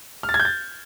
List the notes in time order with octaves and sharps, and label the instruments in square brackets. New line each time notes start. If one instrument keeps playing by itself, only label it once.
[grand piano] F6
A6
G#6
G6
A6